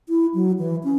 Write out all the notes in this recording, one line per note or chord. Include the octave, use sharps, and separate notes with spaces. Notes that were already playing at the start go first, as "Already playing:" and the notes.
E4
F#3
E3
C#4